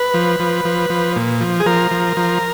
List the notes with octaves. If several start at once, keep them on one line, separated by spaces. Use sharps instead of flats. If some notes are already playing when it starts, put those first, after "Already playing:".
Already playing: B4
F3
F3
F3
F3
A#2
F3
G#4
F3 A#4
F3
F3